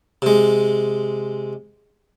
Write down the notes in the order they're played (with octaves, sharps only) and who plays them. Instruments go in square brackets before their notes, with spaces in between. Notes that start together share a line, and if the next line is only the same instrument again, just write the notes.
[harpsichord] C3 G#3